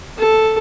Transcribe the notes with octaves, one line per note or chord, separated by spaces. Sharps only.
A4